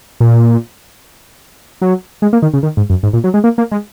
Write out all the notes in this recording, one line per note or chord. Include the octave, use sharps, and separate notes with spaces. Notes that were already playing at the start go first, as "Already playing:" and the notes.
A#2
F#3
G#3
A#3
D#3
C#3
D#3
G#2
F#2
G#2
A#2
F#3
G#3
A#3
A#3
G#3